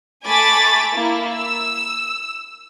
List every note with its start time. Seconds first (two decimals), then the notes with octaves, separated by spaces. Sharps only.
0.24 A3 G#5 B5 D6 A6
0.94 A#3 E4
1.33 E6